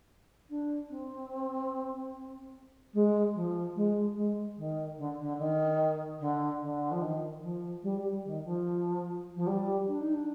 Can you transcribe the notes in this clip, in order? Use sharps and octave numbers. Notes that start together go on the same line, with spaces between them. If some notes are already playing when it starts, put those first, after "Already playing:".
D4
C4
G#3
F3
G#3
G#3
D#3
D3
D3
D#3
D3
D3
F3
D#3
F3
G3
G3
D#3
F3
F3
G3
D4
D#4
D4